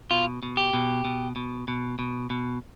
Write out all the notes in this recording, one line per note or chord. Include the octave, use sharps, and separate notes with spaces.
B2 F4
B2
G4
B2
B2
B2
B2
B2
B2